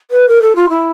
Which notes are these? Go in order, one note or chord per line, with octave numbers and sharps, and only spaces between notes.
B4
A#4
A4
F4
E4